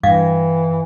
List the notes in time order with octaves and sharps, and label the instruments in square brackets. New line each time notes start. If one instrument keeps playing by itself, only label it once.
[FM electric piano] G2 [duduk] E3 [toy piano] F5 D6